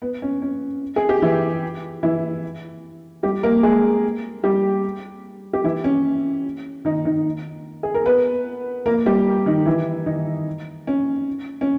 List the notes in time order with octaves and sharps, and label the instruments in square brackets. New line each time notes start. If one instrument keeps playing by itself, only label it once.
[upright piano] B3
C#4
C#4
G#4
G4
E3 E4
E3 E4
G3 G4
A#3 A#4
G#3 G#4
G3 G4
G4
E3 E4
C#4
D#3 D#4
D#3 D#4
G#4
A#4
B3 B4
A#3 A#4
G3 G4
D#3 D#4
E3 E4
D#3 D#4
C#4
C#4